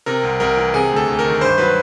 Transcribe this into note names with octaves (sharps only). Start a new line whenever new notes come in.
C3 A#4
C2
C2 A#4
E3
C3 G#4
D2
A4
D2
A#4
D#3
G2 C5
F#3 B4